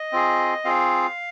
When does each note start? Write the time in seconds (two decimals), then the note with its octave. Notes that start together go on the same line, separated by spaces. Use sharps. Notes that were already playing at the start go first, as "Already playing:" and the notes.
Already playing: D#5
0.12 C4 F4 G#4
0.64 C4 F4 G#4 F5